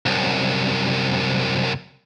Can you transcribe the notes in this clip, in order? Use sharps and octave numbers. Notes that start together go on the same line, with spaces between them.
C2 F#2